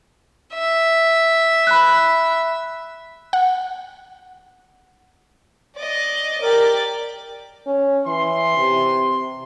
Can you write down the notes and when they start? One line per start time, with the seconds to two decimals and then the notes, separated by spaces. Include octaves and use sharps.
0.54 E5
1.67 B5 F#6
3.33 F#5
5.76 D5 D#5
6.41 G4 A#4 D5
7.67 C#4
8.07 E3 C6
8.58 C3